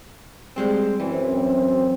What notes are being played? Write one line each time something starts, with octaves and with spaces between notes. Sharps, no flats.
G3 G#3 C4
F#2 E3 C4